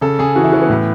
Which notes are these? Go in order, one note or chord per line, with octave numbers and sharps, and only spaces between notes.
C#3 A4
C#3 G#4
E3 F#4
E4
E3 C#4
B3
A2